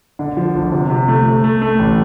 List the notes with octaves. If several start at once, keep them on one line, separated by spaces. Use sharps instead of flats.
D3
F3
G1
C3
C3
A3
A3
A3
A3
A1